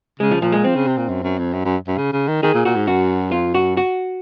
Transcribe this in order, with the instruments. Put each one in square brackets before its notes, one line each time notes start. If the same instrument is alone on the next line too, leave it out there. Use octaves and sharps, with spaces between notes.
[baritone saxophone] C#3 [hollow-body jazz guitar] G#3
[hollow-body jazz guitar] F3
[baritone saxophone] A#2 [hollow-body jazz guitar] F3
[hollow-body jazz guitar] G#3
[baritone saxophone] F3 [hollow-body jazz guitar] C4
[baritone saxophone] C#3
C3
A#2
F#2
F#2
F2
F#2
F#2
F#2
C#3
C#3
D#3
[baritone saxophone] D#3 [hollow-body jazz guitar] G#4
[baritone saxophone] A#2
[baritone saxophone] A#2 [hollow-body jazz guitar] F#4
[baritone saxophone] G#2
[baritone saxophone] F#2 [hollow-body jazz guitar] F#4
[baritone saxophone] F2 [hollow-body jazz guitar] F4
[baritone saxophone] F#2 [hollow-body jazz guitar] F#4
[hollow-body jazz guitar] F#4